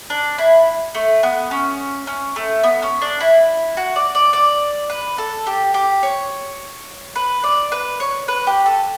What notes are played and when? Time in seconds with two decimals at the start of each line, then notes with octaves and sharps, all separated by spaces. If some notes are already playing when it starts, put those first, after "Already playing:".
0.10 D4
0.38 E4
0.95 A3
1.23 B3
1.51 C#4
2.07 C#4
2.36 A3
2.63 B3
2.82 C#4
3.02 D4
3.20 E4
3.77 F#4
3.96 D5
4.15 D5
4.33 D5
4.90 B4
5.18 A4
5.47 G4
5.74 G4
6.03 C#5
7.16 B4
7.44 D5
7.72 B4
8.00 C#5
8.28 B4
8.47 G4
8.66 A4